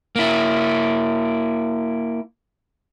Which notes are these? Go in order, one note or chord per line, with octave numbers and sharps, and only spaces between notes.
A#3 E4